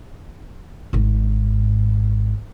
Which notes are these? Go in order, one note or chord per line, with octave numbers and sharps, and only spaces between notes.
G#1 G#2